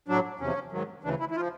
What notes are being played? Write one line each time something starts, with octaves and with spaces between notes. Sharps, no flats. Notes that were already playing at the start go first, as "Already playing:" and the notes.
A2 F#3 D4
E2 C3 F3 C#4
G#2 D#3 F#3
D2 C#3 E3 D4
E4
E4
F3 F4